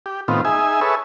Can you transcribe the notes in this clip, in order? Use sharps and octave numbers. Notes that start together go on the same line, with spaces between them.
G4
A2 D#3 B3 C4 F4
D#4 G#4 E5 G#5
G#4 A4 B4 C#5 E5